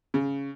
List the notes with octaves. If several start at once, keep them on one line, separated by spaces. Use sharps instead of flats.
C#3